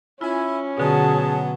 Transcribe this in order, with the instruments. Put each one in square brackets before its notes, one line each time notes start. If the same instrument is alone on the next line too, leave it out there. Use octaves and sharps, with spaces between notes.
[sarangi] C#4 [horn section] E4 G#5 [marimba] F4
[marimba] B2 D3 [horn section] F#3 B3 F#4 [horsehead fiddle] G#4 A5